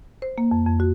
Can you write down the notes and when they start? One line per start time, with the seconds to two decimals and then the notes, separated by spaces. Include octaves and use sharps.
0.22 C5
0.38 A#3
0.51 F2
0.67 F2
0.80 F#4